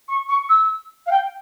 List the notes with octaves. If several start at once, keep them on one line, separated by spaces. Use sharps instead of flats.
C#6
C#6
E6
F5
G5